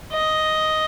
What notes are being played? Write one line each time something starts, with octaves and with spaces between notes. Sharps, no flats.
D#5